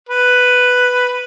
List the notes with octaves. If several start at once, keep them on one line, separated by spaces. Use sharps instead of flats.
B4